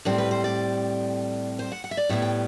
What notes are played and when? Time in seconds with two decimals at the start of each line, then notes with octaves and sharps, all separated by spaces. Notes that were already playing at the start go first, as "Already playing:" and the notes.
0.05 A2 G3 C4 C5
0.18 B4
0.31 C5
0.44 D5
1.59 C5
1.72 F#5
1.84 F#5
1.91 E5
1.97 D5
2.09 A2 G3 B3 E4 E5
2.22 G5